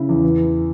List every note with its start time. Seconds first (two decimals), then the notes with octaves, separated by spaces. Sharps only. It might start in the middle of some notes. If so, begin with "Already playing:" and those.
Already playing: C#3 E4
0.09 E2
0.23 E3